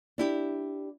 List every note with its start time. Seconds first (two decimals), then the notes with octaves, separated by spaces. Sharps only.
0.18 D4 E4 G4